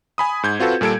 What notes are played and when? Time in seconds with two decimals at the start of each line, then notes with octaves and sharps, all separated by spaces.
0.18 G#5 B5 D#6
0.43 G#2 G6 G#6
0.60 C4 F4 F#4 A4 B4
0.81 A#2 G3 A4 G#6 D7